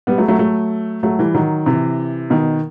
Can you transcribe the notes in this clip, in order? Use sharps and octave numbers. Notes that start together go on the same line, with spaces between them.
G3 B3
F#3 A3
F#3 A3
F#3 A3
F#3 A3
E3 G3
D#3 F#3
C3 E3
B2 D#3